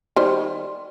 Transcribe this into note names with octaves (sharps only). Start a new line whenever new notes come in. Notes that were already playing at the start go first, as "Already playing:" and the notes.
D#3 G3 C5